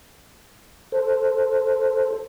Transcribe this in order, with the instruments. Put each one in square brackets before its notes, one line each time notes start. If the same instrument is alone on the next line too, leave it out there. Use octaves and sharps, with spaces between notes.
[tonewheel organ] A4 C5